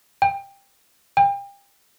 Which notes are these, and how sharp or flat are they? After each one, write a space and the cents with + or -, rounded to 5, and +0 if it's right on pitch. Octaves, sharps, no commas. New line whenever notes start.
G5 +15
G5 +30